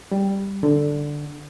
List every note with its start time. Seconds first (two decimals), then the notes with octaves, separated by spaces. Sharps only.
0.12 G3
0.63 D3